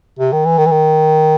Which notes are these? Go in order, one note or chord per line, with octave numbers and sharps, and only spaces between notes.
C3
D#3
E3
D#3
E3
D#3